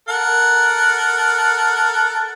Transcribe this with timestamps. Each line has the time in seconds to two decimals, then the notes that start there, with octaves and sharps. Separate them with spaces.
0.08 A4 A#4 F#5